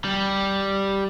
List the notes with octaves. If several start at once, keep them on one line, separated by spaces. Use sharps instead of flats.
G3